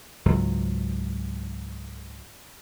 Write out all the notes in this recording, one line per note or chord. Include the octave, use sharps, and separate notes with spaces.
C#2 G#2 F#3